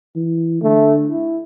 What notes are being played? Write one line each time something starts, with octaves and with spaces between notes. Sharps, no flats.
E3
D3 A3
E4